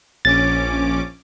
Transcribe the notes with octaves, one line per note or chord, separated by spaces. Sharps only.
A#1 C#4 D6 A6